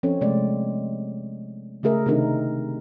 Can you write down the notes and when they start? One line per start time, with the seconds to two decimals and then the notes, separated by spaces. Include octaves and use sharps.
0.03 F3 C4 C#4 A4 C#5
0.21 C3 G#3 A3 D5
1.83 C#3 A3 G#4 A#4 E5
2.06 C3 D#3 C4 D4 D#4 A#4